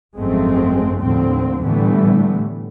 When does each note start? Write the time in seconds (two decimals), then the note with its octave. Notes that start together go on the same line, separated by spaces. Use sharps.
0.16 G#1 F#2 F3 G#3 A3 C4
1.01 D#2 A2 D3 F3 C4
1.62 A2 D3 E3 G3 A3 B3